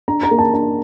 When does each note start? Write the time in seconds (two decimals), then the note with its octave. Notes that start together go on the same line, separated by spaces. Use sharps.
0.08 D4 A#5
0.23 A#5
0.31 A#3
0.39 A5
0.54 D4 A5